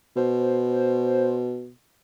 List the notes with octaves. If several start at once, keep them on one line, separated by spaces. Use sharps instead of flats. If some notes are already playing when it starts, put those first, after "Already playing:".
B2 C5